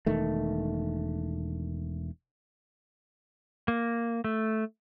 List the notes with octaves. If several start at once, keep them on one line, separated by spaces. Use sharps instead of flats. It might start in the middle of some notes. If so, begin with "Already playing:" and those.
E1 D#3 A3
A#3
A3